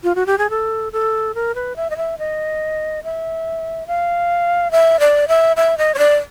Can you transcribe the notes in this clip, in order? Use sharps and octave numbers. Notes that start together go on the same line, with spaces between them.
F4
F#4
G4
G#4
A4
A4
A#4
B4
E5
D#5
E5
D#5
E5
F5
E5
D5
E5
E5
D#5
C#5
D5